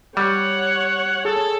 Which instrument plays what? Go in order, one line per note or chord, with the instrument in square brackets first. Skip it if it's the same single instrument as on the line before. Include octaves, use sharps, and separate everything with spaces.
[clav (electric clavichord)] G3 [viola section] C#5 [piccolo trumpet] F#5
[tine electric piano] G#4 [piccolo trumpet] A4